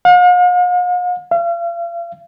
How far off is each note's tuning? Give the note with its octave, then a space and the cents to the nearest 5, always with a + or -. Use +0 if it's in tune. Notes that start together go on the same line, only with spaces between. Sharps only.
F5 +45
F5 -40